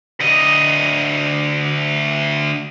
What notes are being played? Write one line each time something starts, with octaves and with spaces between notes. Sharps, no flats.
D2 D#5